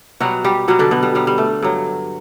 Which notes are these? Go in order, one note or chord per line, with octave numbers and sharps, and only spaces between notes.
B2 F#3 G3 F#4
G3 G4
B2 F#3 G3 F#4
D3 D4
B2 B3
G3
G2 F#3 G3
G3
A3
G2 F#3